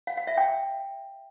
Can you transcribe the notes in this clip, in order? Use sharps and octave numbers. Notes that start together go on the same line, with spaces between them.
F5
F5
E5
G5